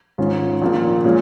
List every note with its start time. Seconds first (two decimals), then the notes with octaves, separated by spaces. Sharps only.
0.18 G#2 D#3 C#4 F4
0.62 A#1 A#2 A#3
1.04 A#2 G#3 C#4 F4